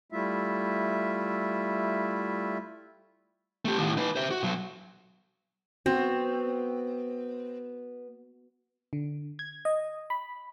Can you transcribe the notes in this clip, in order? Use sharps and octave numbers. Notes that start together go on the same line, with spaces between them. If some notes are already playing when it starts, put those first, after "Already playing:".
G3 A3 E4 F4 E5
A3 G4
D#2 A2
D#4 B4
C5 E5
F#4
B1 F#3
B3 C4 F#4
D3
G#6
D#5
B5